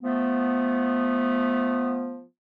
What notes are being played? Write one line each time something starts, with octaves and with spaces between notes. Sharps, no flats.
F3 A3 B3